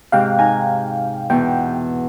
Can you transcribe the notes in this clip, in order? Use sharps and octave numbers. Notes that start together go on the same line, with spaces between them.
G#2 C3 F5 G5 F#6
D#4 G#5 A#5
E2 B2 G5